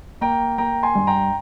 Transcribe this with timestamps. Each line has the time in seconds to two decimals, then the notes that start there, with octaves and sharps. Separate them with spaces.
0.21 A#3 G5 A#5
0.58 A#3 G5 A#5
0.83 G#5 C6
0.95 G2
1.07 G5 A#5